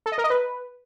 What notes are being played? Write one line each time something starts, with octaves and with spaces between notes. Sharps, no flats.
A4
D#5
A#4
D#5
B4